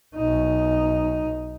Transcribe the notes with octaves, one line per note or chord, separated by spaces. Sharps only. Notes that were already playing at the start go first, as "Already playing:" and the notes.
B1 D#4